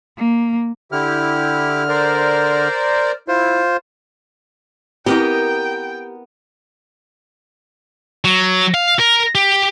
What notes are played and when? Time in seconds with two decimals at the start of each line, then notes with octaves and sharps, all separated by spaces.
0.17 A#3
0.92 D3 E4 G4 F6
1.89 A#4 C5 D5
3.28 E4 F4 C5
5.06 B3 C4 E4 G4 A#4 D#5 G5
8.25 F#3
8.74 F5
8.99 A#4
9.35 G4